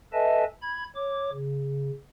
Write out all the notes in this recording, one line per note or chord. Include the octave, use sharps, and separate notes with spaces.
A4 B4 D#5 E5 G#5 A5
B5 G#6
C#5 D6
C#3